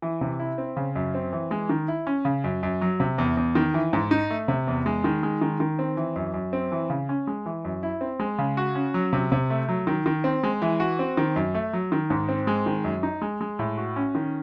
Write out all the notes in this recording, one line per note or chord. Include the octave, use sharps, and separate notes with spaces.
E3
C3
E4
C4
C#3
F#2
C4
E3
G#3
D#3
E4
C#4
C#3
F#2
F#2
F#3
C3
E2
E2
D#3
E3
G#2
D#4
A3
C3
E2
G#3
D#3
G#3
D#3
D#3
C4
E3
F#2
F#2
C4
E3
C#3
C#4
G#3
E3
F#2
E4
C4
G#3
C#3
F#4
C#4
F#3
C3
C3
A3
F#3
D#3
D#3
C4
G#3
E3
F#4
C4
D#3
F#2
A3
F#3
D#3
G#2
C4
G#3
D#3
F#2
D#4
G#3
G#3
A2
F#4
C#4
D#3